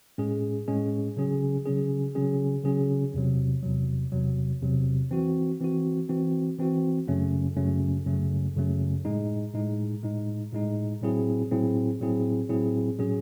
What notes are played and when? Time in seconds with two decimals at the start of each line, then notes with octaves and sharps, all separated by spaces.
0.18 A2 G#3 C#4 G#4
0.68 A2 G#3 C#4 G#4
1.17 C#3 F#3 C#4 G#4
1.66 C#3 F#3 C#4 G#4
2.15 C#3 F#3 C#4 G#4
2.64 C#3 F#3 C#4 G#4
3.14 E2 C3 F#3
3.62 E2 C3 F#3
4.12 E2 C3 F#3
4.61 E2 C3 F#3
5.11 E3 C4 F#4
5.60 E3 C4 F#4
6.09 E3 C4 F#4
6.58 E3 C4 F#4
7.07 F#2 C#3 F#3 A3 C#4
7.56 F#2 C#3 F#3 A3 C#4
8.06 F#2 C#3 F#3 A3 C#4
8.56 F#2 C#3 F#3 A3 C#4
9.05 A2 G#3 D#4
9.53 A2 G#3 D#4
10.03 A2 G#3 D#4
10.53 A2 G#3 D#4
11.02 A2 F#3 C4 E4 G#4
11.51 A2 F#3 C4 E4 G#4
12.00 A2 F#3 C4 E4 G#4
12.49 A2 F#3 C4 E4 G#4
12.99 A2 F#3 C#4 G#4